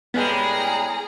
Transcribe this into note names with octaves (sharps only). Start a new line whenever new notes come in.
A2 G3 G#3 B3 G#4 A#5